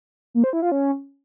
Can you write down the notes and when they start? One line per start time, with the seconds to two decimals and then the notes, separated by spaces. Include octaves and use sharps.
0.34 A#3
0.44 C5
0.53 E4
0.62 F4
0.72 C#4